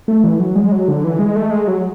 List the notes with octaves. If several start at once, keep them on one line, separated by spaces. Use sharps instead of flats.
A3
E3
F#3
G#3
F#3
D3
E3
G#3
A3
G#3
F#3